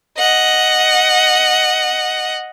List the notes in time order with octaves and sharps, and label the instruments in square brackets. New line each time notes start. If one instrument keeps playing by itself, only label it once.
[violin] D#5 F#5